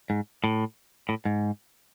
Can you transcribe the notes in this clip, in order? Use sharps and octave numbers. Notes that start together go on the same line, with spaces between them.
G#2
A2
A2
G#2